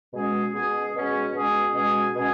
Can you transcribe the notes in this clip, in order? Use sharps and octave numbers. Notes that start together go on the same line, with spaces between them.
B2 G#3 C#4 G#4
B2 G#3 C#4 G#4
B2 G#3 C#4 G#4
B2 G#3 C#4 G#4
B2 G#3 C#4 G#4
B2 G#3 C#4 G#4